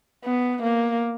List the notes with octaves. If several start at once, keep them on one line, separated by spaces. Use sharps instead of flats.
B3
A#3